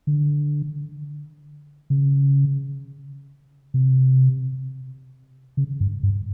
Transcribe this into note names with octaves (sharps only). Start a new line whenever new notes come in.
D3
C#3
C3
C#3
G2
G2